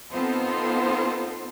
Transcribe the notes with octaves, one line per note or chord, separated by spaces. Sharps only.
B3 C4 D#4 F4 A4 C5